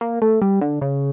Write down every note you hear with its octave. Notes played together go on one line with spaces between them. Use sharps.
A#3
A3
G3
D3
C#3